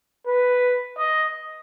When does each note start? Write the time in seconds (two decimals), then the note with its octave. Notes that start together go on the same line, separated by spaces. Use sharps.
0.27 B4
0.98 D#5